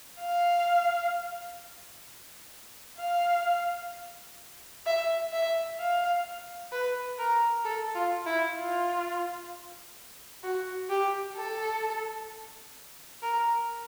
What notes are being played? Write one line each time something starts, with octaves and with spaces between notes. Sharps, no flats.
F5
F5
E5
E5
F5
B4
A#4
A4
F4
E4
F4
F#4
G4
A4
A#4